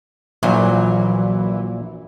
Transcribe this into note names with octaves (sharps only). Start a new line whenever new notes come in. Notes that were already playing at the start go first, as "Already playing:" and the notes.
A#1 A#2 E3 F#3